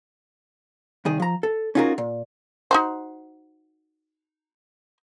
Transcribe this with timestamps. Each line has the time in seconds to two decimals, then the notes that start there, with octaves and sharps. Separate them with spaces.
1.05 C2 D#3 G#4
1.20 F3 A#5
1.43 A4
1.75 C#4 D#4 F4 F#4 G#4 A#4
1.98 A#2
2.71 D#4 F#4 C5